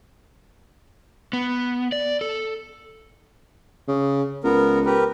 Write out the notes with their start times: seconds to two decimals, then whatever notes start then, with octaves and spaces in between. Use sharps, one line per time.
1.33 B3
1.92 D5
2.21 A4
3.88 C#3
4.44 C#2 B3 A#4
4.86 G4 A#4 B4